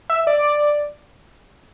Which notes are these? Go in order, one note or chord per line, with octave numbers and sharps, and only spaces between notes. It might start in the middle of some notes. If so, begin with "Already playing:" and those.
E5
D5